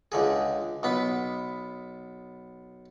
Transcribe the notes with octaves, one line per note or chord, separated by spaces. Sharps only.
C#2 D3 G#4
B1 B3 B5